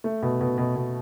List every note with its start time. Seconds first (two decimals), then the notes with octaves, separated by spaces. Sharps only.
0.04 A3
0.22 B2
0.41 B2
0.58 B2
0.76 B2